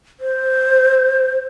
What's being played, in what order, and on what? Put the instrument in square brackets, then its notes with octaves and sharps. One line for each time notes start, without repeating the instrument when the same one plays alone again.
[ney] C5